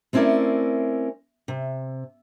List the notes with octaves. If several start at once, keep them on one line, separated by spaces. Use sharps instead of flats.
A3 C4 C#4 E4 A#4 D5
C3